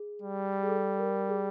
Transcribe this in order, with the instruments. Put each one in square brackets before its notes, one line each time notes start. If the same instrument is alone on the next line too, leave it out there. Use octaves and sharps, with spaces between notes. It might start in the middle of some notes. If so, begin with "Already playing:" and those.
Already playing: [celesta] G#4
[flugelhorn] G3
[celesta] G#4
A4
A#4
G#4